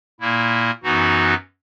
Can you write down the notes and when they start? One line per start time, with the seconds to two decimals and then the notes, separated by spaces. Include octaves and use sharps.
0.20 A#2 A#3 E4
0.83 F#2 E3 B3 D#4 F#4